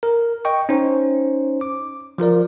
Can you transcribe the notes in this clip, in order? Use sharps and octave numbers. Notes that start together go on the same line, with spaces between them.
A#4
D#5 G5 C#6
C#4 D#4 C5
D6
F3 F4 A#4 D5